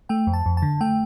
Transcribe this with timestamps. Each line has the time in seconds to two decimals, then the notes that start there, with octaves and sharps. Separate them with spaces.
0.09 A3 G5
0.27 F2
0.33 A5
0.46 F2
0.57 A5
0.62 D3
0.81 A3 G5